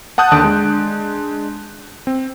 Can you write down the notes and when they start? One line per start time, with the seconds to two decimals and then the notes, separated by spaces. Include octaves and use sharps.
0.18 F#5 A5 D#6 F#6 G6
0.32 D#2 D3 A5 D#6 D7
0.44 G#3 D4
2.07 C4